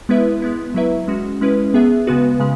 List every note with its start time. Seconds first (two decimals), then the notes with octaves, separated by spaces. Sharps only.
0.09 G#3 B3 E4 B4 E5
0.42 G#3 B3 E4
0.74 F#3 E4 B4 E5
1.08 G#3 C#4 F#4
1.41 G#3 C#4 E4 B4
1.74 B3 G#4 E5
2.07 C#3 G#3 B3 F#4 B4
2.40 C#3 G#3